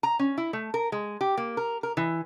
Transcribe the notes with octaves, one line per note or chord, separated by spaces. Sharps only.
A#5
C#4
E4
A3
A#4
G#3
G4
A#3
A#4
A#4
E3